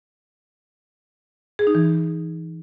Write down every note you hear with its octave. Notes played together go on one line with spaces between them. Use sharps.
G#4
D#4
E3